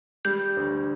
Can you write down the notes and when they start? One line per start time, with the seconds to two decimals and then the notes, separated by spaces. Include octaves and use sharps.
0.25 G3 G6
0.57 D2